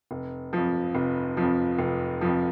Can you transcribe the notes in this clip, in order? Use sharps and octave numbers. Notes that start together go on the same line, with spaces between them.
F1
F2 F3
F1
F2 F3
F1
F2 F3